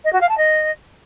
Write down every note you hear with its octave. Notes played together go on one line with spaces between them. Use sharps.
D#5
F#4
F5
A5
D#5